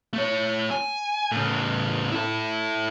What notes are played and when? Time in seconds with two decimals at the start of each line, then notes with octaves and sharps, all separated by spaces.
0.14 A3 C#5
0.71 G#5
1.32 A2 C#3
2.12 E4 A4